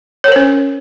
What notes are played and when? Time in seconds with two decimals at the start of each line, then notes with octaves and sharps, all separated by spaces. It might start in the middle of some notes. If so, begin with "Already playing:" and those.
0.24 C#5
0.28 A#4
0.32 C5
0.36 C#4